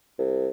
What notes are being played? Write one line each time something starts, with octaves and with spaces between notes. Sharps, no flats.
C2